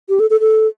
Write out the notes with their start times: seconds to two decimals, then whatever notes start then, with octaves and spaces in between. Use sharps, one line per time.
0.09 G4
0.20 A4
0.30 A4
0.40 A4